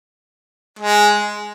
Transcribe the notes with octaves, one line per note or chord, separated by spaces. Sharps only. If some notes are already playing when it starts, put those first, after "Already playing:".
G#3